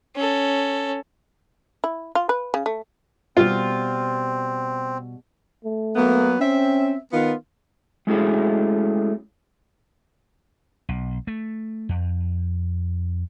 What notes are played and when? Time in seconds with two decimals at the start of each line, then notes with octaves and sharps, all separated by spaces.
0.16 C#4 A4
1.84 E4
2.15 F4
2.29 B4
2.54 C#3
2.66 A3
3.37 B2 G3 C4 F4 G4
5.65 A3
5.96 F#3 A#3 B3
6.40 C4 C#4 E5
7.13 D#3 B3 F4
8.07 G#3 A3 C#4 E4 F#4 G#4
10.89 B1
11.27 A3
11.89 F2